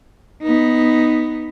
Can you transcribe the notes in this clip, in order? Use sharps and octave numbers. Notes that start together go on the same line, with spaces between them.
B3 D#4